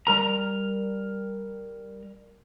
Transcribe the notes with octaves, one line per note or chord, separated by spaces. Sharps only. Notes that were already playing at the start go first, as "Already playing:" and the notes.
G3 A#4 A#5